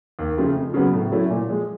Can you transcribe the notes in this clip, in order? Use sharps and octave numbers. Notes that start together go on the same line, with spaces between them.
D#2
C#3 F3 A3 C4
F2
C#3 F#3 B3
A2
F#3 A3 C#4 E4
A#2
F3 G#3